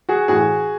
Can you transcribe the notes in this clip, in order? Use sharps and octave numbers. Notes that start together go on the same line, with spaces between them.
F#4 G#4
A2 E3 F#4 G#4